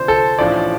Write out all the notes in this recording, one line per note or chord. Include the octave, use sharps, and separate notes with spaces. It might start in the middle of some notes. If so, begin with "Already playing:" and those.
Already playing: D2 C3 F3 D4 C5
A4
A1 A2 F3 D4 D5